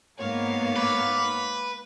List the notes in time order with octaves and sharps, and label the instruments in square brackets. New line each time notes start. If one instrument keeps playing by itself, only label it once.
[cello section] G#2 A#3 B3 [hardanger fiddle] C#5 F5
[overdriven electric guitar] B4 [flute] D6